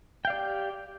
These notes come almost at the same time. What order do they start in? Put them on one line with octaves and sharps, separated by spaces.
G5 F5 D5 G4